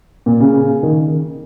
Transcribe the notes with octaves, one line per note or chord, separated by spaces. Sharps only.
A#2
C#3
D#3